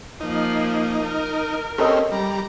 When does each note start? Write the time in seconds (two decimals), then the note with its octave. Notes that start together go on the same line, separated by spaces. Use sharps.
0.20 F3 A#3 D#4
1.03 A#4
1.78 C4 C#4 G4 A4 A#4 D#5
2.12 G3 A#5